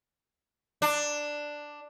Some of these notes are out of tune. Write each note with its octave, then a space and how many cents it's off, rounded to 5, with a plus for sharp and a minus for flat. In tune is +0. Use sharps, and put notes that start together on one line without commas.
D4 +5